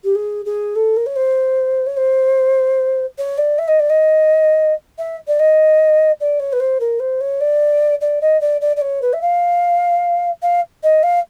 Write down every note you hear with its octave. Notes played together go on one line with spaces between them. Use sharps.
G4
G#4
G#4
A4
A#4
C#5
C5
C#5
C5
C#5
D5
E5
D#5
D5
D#5
E5
D5
D#5
D5
C#5
B4
C5
A#4
C5
C#5
D5
D5
D#5
D5
D5
D5
C#5
B4
E5
F5
F5
D#5
F5